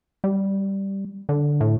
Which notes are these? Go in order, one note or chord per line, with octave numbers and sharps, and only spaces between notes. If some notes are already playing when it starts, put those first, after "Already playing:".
G3
D3
A2